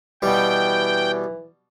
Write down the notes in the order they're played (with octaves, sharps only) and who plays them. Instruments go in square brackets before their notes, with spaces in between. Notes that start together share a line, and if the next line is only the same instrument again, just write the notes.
[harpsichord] B2 G3 [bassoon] E3 [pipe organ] G5